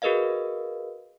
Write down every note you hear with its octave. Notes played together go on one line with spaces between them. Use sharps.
F#4 G#4 A#4 B4 D#5 F5